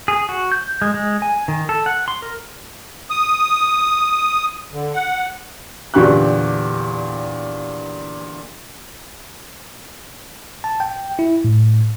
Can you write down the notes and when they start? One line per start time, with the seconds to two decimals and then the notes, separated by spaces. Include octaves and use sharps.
0.08 G#4
0.29 F#4
0.52 G6
0.82 G#3
0.94 G#3
1.22 G#5
1.48 D#3
1.69 A4
1.86 F#5
2.08 C6
2.22 A#4
3.10 D#6
4.73 D3
4.94 F#5
5.94 E2 A#2 D3 G4 C#6 F#6
10.64 A5
10.80 G5
11.19 E4
11.45 A2